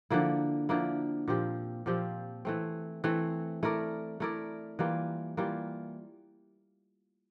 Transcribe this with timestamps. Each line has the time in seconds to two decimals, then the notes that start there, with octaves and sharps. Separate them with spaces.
0.10 D3 F3 A#3 E4
0.69 D3 F3 A#3 E4
1.28 A#2 F3 C4 G4
1.86 A#2 F3 C4 G4
2.45 E3 A3 C4
3.04 E3 A3 C4
3.63 A3 E4 A#4 D5
4.20 A3 E4 A#4 D5
4.79 E3 G3 A#3 F4
5.37 E3 G3 A#3 F4